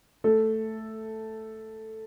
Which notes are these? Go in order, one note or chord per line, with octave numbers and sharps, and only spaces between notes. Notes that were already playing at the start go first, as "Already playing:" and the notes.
A3 A4